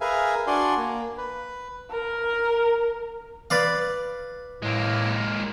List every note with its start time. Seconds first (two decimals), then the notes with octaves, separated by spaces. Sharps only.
0.01 G#4 A#4 B4 E5 F5 G#5
0.47 D4 F#4 D5 G#5 C6
0.77 A#3
1.17 B4
1.90 A#4
3.50 B4 D5 F5
4.62 A2 G#3 A#3